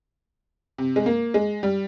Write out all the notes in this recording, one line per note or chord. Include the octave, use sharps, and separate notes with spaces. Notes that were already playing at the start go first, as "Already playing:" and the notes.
C3
G#3
A#3
G#3
G3